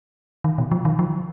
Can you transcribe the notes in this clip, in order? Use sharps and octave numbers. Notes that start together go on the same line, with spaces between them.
D#3
B2
F3
D#3
F3